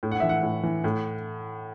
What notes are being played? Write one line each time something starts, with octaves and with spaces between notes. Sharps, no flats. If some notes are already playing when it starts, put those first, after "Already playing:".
A2
F#5
E3 E5
F#5
A2
E3
A2